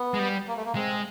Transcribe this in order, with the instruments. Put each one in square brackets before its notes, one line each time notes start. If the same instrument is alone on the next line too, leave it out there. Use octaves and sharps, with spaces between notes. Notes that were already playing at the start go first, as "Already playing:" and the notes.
Already playing: [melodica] B3
[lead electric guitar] G#3
G3
[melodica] A#3
A3
A#3
[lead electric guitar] G#3 [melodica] C4